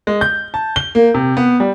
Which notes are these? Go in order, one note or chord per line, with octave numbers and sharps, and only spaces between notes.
G#3
G6
A5
G7
A#3
C3
B3
G3